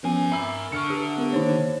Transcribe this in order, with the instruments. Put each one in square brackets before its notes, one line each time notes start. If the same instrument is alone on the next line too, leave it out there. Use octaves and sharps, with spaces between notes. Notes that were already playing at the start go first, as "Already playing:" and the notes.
[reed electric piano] F3 B3 C#4 [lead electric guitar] A#4 G#5
[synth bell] E5 A#5 E6 [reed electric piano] B5
[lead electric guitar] D3 [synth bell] C#6 F6 C#7
[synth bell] G4
[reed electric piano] B3 A#4
[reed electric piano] D#3 A#3 [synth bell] D#4 C5 C#5